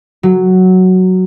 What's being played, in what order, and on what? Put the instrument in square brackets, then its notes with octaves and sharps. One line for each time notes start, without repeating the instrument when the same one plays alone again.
[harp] F#3